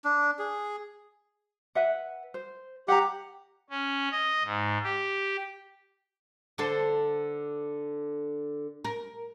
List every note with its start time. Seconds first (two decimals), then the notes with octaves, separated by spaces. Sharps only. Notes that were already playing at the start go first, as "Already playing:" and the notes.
0.05 D4
0.39 G#4
1.75 B4 E5 F#5
2.34 C5
2.88 G4 F#5 A#5
3.70 C#4
4.12 D#5
4.44 G#2
4.83 G4
6.58 D3 A4 C5
8.85 A#4